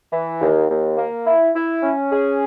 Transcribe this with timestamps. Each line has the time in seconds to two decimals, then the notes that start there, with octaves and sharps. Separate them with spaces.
0.12 E3
0.41 D#2
0.69 D#2
0.97 A#3
1.26 E4
1.54 E4
1.83 C#4
2.11 G#4